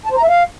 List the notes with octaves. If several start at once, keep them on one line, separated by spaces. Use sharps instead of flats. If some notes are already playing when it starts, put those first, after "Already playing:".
A5
C5
A#5
E5
F5